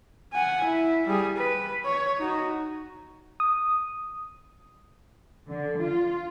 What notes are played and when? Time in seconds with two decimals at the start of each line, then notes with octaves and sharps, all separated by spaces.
0.33 F#5 G#5
0.64 E4
1.07 G3 G#4
1.37 B4
1.85 C#5
2.18 D#4 F#4
3.40 D#6
5.50 D3
5.80 F4